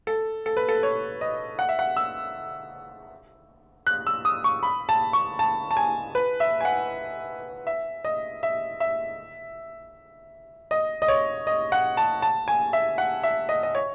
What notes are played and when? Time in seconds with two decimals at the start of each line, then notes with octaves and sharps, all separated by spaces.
0.07 A4
0.46 A4
0.57 B4
0.69 A4
0.83 C#5
1.21 D#5
1.59 F#5
1.69 E5
1.79 F#5
1.97 E6
3.87 F#6
4.07 E6
4.25 D#6
4.44 C#6
4.63 B5
4.89 A5
5.13 C#6
5.39 A5
5.71 A5
5.77 G#5
6.15 B4
6.40 E5
6.61 G#5
6.65 F#5
7.67 E5
8.04 D#5
8.43 E5
8.80 E5
10.71 D#5
11.02 D#5
11.08 C#5
11.47 D#5
11.72 F#5
11.97 A5
12.22 A5
12.48 G#5
12.73 E5
12.98 F#5
13.23 E5
13.49 D#5
13.63 D#5
13.75 C#5